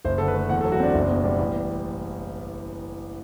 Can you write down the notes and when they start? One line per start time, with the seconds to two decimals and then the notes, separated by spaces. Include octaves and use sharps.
0.05 F#1 C5
0.18 D3 A4
0.28 B4
0.35 A3
0.50 E2 F#5
0.61 A4
0.65 F#3
0.72 F#4
0.80 C4 D4
0.94 F#1
1.09 B2
1.24 G3
1.39 A1